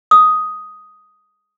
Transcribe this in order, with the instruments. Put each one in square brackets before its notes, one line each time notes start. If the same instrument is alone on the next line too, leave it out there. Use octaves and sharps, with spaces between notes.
[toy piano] D#6